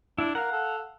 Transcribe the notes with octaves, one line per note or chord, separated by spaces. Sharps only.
D4 E4
A#4 F5 F#5
A4